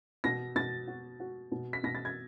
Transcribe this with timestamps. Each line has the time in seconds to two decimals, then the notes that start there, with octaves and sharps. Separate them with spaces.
0.24 B2 A#6
0.56 B2 A6
0.88 F#4
1.20 F#4
1.52 B2
1.73 B6
1.83 B2 A#6
1.95 A6
2.05 G#6